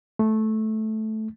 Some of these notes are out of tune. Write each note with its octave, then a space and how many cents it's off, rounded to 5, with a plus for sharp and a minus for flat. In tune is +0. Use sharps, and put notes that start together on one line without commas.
A3 -10